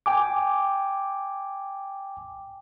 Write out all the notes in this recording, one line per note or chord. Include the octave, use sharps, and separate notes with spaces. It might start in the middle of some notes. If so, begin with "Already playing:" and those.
G5 G#5 D6